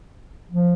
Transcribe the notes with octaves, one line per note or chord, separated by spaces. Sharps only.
F3